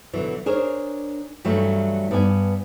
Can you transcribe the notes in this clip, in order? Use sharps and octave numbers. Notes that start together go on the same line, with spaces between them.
B2 D3 E3 F#3
D4 G#4 A#4 C5 C#5
G2 E3 F#3 G3 A3
G2 B3 B4 D5 G#5